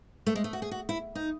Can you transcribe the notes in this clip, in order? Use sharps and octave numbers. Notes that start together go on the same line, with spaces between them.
A3
G#3
A3
F#4
G#4
F#4
E4
D#4